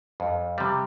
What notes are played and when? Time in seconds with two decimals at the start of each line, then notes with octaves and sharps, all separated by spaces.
0.20 F2
0.58 C3 G3